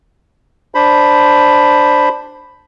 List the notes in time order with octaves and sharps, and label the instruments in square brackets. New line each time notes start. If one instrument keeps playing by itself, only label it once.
[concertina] D4 C5 B5